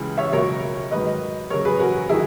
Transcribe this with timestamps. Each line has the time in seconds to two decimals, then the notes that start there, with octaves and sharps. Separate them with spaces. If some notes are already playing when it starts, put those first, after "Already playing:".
Already playing: C#2 C#3 E3
0.18 C#5 E5
0.33 C#2 B2 F#3 A#4 C#5
0.91 G#2 D#3 F#3 B4 D#5
1.50 F#2 C#3 F#3 A#4 C#5
1.65 G#4 B4
1.80 F#4 A#4
2.09 D#3 F#3 E4 G#4